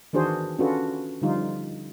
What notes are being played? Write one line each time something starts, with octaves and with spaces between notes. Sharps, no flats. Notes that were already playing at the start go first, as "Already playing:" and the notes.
D#3 E3 D4 F#4 G#4 C5
C#4 D4 F4 F#4 A4 B4
D3 F3 G3 D#4 F4